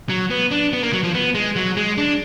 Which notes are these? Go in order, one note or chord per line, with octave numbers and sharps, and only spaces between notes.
F#3
B3
D4
B3
A#3
F#3
F3
B3
G#3
F#3
G#3
D4